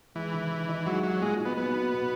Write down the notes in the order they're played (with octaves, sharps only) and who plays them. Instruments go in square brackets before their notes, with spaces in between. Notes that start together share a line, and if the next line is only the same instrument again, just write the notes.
[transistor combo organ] E3 [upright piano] G#3
[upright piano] D#3
D#3
D#4
[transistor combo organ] F#3 [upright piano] G#3
[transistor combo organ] F#3 [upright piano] F#4
[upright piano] A#2 [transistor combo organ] G#3
[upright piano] D#4
[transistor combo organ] B3
[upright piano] F#3 [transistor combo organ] B3
[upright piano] D#4
B2